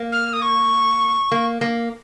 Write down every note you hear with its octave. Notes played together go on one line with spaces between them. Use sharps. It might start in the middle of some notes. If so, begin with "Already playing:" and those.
Already playing: A#3
F6
D#6
C#6
A#3
A#3